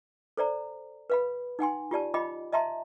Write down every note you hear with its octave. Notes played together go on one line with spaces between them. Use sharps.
A4 C5 D5 A#5
B4 F5 B5
D#4 F#5 G#5 C6
F4 G4 D5 A5
F4 D#5 G5 B5 D6
D#5 E5 A5 A#5 C6